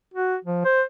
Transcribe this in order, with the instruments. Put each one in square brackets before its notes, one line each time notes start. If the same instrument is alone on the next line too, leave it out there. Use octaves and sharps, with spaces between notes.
[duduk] F#4
F3
C5